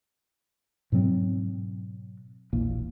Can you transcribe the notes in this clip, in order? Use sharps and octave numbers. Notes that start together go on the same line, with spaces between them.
G#2 B2 F#3 C4
E1 A#1 E3 A#3